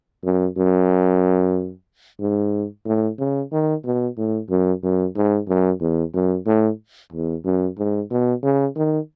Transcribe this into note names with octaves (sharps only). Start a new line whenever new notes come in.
F#2
F#2
G#2
A2
C#3
D#3
B2
A2
F#2
F#2
G#2
F#2
E2
F#2
A2
E2
F#2
G#2
B2
C#3
D#3